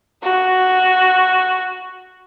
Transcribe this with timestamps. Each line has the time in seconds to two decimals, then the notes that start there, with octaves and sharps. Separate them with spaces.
0.23 F#4